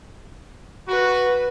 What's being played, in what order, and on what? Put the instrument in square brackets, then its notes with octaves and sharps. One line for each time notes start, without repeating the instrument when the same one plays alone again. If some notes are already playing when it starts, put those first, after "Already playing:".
[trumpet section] F#4 [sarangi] B4